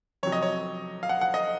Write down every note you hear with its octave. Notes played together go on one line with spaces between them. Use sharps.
F2 C3 F#3 C#5
D#5
C#5
F5
F#5
F#5
D#5